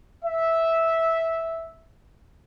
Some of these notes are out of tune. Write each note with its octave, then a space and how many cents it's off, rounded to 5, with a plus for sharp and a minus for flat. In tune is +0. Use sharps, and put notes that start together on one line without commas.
E5 -10